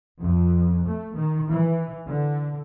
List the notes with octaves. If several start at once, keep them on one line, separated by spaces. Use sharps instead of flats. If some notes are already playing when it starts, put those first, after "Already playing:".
F2
A3
D#3
E3
D3